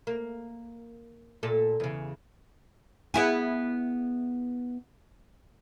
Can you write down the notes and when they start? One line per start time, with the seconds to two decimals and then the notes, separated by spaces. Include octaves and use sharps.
0.07 A#3
1.43 A#2 A4
1.80 E2 C#3
3.14 B3 E4 G#4